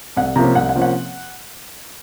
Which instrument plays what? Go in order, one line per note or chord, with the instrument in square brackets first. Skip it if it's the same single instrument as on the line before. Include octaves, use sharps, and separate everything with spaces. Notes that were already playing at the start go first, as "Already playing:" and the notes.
[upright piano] C2 F#5
C3 F3 A#3 C#4 A#5
C2 F#5
F#5
C3 F3 A#3 C#4
F#5